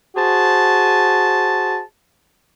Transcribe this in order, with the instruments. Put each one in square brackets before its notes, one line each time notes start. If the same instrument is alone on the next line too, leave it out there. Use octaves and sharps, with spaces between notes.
[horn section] F#4 G#4 C5 A5